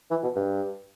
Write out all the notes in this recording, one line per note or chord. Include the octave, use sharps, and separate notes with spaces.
E3
B2
G2